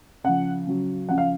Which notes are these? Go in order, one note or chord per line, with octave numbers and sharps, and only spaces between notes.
C#3 F3 F#5
C#3 F#3
C#3 F3 F#5
F5